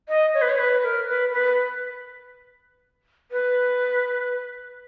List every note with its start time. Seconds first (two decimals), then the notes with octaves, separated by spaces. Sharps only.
0.09 D#5
0.34 C#5
0.42 B4
0.49 C#5
0.59 B4
0.83 A#4
1.08 B4
1.33 B4
3.31 B4